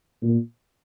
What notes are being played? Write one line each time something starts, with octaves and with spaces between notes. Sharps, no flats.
A#2